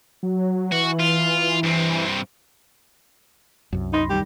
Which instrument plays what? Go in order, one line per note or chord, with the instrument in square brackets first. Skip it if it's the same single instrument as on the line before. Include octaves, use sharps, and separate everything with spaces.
[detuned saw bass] F#3
[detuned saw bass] E3 [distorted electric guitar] F#4
[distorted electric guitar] F4
G2 C4
[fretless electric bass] C2 F#2
[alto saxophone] D#4 [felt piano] B5 C6 A#6
[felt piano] D#3 G3 [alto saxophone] G4